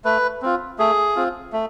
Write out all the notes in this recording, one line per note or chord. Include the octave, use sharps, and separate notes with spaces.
A3 B4
C4 F4
A3 G#4
C4 F4
A3